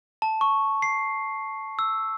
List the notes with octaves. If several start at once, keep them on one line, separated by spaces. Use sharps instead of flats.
A5
C#6
C7
E6